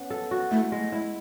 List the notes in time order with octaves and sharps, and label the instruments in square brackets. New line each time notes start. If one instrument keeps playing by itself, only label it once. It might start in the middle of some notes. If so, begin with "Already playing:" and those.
Already playing: [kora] B3 C#4
A4
F#4
[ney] A3 [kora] E4
[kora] G#3
[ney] A3
[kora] E4